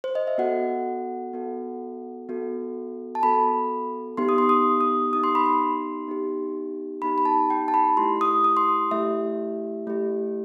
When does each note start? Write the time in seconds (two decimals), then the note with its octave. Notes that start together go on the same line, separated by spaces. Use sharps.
0.04 C5
0.15 D#5
0.27 E5
0.38 B3 F#4 A4 F#5
1.33 B3 F#4 A4
2.29 B3 F#4 A4
3.15 A5
3.23 B3 F#4 A4 B5
4.17 B3 D#4 G4 C6
4.29 D#6
4.38 C6
4.49 D#6
4.81 D#6
5.13 B3 D#4 G4 D#6
5.23 C6
5.35 B5
5.46 C6
6.07 B3 D#4 G4
7.02 B3 D#4 G4 B5
7.18 B5
7.25 A5
7.50 G5
7.68 A5
7.74 B5
7.97 A3 E4 G4 C6
8.21 D#6
8.44 D#6
8.57 C6
8.69 D#6
8.91 A3 E4 G4 E5
9.87 A3 E4 G4